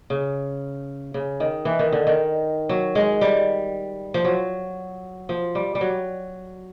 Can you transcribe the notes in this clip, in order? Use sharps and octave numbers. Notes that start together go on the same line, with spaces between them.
C#3
C#3
D#3
E3
D#3
D3
D#3
F#3
G#3
G3
F3
F#3
F3
G3
G3
F#3